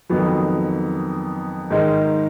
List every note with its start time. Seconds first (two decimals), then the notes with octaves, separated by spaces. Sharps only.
0.09 F2 D#3 F#3 B3
1.70 G#2 D#3 G#3 D#4 A#4